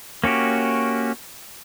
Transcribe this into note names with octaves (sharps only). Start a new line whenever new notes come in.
A#3 C#4 F#4 G4